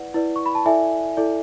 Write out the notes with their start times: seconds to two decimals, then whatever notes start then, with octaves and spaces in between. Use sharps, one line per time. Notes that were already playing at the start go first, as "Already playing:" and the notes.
Already playing: E4 B4 D5 F#5
0.14 E4 B4 D5
0.36 C#6
0.46 B5
0.55 A5
0.66 E4 A4 D5 E5 G#5
1.17 E4 A4 D5